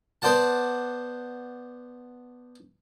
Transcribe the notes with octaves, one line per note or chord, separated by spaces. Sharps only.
B3 C5 D5 F#5 A5